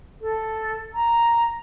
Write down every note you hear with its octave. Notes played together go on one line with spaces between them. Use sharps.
A4
A#5